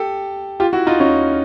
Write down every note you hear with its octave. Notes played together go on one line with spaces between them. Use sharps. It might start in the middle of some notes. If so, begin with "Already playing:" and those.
Already playing: G4 A4
F4 G4
E4 F#4
D#4 F4
C#4 D#4